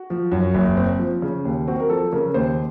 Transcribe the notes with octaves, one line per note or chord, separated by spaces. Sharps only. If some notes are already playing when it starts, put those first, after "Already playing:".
Already playing: F#4
F3
F#2
F#1
C4
F3
C#3
D#2
C4 F#4
A#4
F3 A4
C#3 A#4
D#2 C5